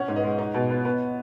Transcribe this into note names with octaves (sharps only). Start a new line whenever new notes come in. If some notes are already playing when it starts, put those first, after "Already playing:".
Already playing: C#4 C#5 F#5
G#2
B4 D#5
G#3
D#4
B2
B3
B3